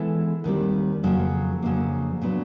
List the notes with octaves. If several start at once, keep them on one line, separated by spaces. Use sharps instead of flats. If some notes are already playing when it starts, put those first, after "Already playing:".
Already playing: E3 G#3 B3 E4 A4
D#2 D#3 G3 C4
F2 C#3 F#3 A#3
F2 C#3 F#3 A#3 D4
A#2 F#3 B3 D4